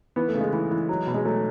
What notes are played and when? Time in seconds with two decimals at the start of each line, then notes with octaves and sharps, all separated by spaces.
0.16 E3 B3
0.28 A3
0.35 C#3
0.41 G#3
0.53 E3
0.71 E3
0.89 F#3
1.07 B2
1.14 G#3
1.25 F#3 A3